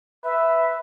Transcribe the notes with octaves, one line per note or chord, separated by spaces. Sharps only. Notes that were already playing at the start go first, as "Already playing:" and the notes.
B4 E5